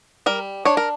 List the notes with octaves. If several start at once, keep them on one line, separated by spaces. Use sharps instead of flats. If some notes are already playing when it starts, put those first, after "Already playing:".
G3 A#4
D4 C#5
A#4